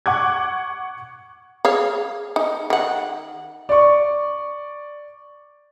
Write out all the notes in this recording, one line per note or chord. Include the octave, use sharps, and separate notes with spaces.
F#5 C#6 D6 F#6 G#6
G#4 C#5 F5
D#4
D#3 F#5
D5 C#6